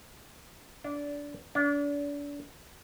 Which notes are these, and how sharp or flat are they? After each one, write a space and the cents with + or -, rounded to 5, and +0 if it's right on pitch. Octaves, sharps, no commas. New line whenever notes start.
D4 -20
D4 -35